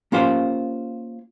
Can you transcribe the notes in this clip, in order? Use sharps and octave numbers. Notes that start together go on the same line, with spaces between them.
A#3 C#4 F4 G4 C5 F5